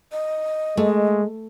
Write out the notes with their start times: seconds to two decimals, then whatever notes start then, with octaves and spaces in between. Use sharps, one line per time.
0.12 D#5
0.77 G#3 A3